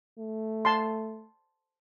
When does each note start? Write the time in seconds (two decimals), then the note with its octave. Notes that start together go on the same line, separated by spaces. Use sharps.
0.19 A3
0.65 A5 C6